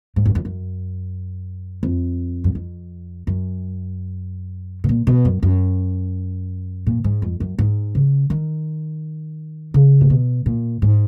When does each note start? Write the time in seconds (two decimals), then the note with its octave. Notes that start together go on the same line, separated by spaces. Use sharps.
0.16 G#2
0.26 F#2
0.35 F2
0.45 F#2
1.83 F2
2.44 F#2
2.55 F2
3.27 F#2
4.84 B2
4.89 A#2
5.07 B2
5.25 F#2
5.43 F#2
6.87 A#2
7.04 G#2
7.22 F2
7.40 F#2
7.59 G#2
7.95 C#3
8.30 D#3
9.74 C#3
10.01 A#2
10.10 B2
10.46 A#2
10.82 G#2